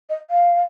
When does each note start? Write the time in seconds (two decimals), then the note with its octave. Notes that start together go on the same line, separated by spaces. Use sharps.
0.09 D#5
0.30 F5